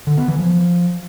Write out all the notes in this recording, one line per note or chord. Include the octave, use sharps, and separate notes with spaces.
D3
B3
E3
F3